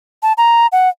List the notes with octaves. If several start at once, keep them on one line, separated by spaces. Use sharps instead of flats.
A5
A#5
F#5